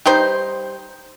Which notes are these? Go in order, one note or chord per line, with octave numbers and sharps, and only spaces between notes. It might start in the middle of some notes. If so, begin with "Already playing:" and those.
G3 D#4 C5